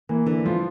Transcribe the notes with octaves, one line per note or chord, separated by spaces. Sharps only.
E3 A#3
D3 E3
F3 F4